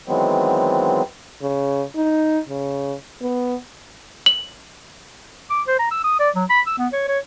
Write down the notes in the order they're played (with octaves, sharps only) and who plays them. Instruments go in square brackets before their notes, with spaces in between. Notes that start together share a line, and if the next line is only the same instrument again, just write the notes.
[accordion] D#3 E3 F#3 G#3 B3 C4
[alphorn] C#3
D#4
C#3
B3
[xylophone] F#7
[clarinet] D6
C5
A#5
E6
D#6
D5
F#3
B5
E6
B3
C#5
C#5